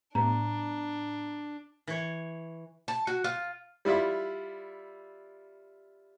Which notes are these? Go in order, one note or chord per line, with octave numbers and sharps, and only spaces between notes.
A2 G3 B3 D4 A#5
E3 C#5
A5
F#4
F4
G3 E4 F4 E5